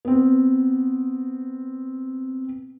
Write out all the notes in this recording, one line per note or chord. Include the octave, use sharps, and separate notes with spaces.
B3 C4